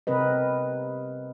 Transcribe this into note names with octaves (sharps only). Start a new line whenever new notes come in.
C3 C4 A#4 B4 D#5